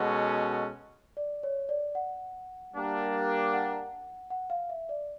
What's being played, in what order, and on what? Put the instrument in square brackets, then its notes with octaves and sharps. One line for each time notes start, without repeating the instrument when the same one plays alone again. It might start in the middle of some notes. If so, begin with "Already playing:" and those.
Already playing: [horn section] B2 G#3 C#4 F#4 A4
[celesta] D5
C#5
D5
F#5
[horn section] G3 A#3 D4 G4 A#4
[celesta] F#5
F#5
F5
E5
D5